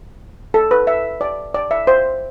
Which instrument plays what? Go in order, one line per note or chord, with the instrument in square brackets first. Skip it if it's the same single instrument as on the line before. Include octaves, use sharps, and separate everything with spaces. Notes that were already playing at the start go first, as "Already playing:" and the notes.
[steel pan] A4
B4
E5
D5
D5
E5
C5